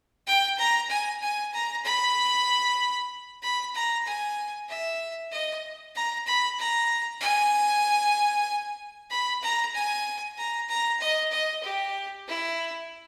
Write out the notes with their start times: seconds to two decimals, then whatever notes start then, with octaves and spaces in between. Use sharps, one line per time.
0.27 G5
0.58 A#5
0.90 G#5
1.22 G#5
1.54 A#5
1.85 B5
3.42 B5
3.74 A#5
4.06 G#5
4.69 E5
5.32 D#5
5.96 A#5
6.27 B5
6.58 A#5
7.21 G#5
9.10 B5
9.42 A#5
9.74 G#5
10.37 A#5
10.69 A#5
11.00 D#5
11.32 D#5
11.63 G4
12.27 E4